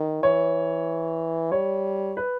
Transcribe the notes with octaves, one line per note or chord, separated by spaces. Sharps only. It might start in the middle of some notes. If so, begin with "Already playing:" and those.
Already playing: D#3
E3 C#5
G3 C#5
B4